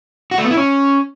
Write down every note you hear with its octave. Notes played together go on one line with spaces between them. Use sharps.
F#4
A3
B3
E4
C#4